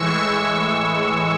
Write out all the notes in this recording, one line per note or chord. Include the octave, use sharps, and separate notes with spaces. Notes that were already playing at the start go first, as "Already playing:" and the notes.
Already playing: A2 E3 G#3 C#6 E6